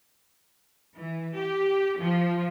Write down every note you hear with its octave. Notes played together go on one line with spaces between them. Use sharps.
E3
G4
F3